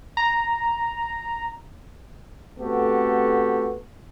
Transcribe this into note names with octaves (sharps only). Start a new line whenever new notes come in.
A#5
A3 B3 C4 F#4 G4 A4